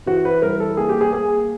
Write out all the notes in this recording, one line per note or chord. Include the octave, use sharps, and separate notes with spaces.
E3 F#4
B4
G3 A#4
A4
A#3 G#4
G4
G#4
A#3 G#4